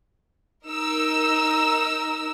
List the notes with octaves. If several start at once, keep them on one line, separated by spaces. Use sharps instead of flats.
D#4 A#4 E6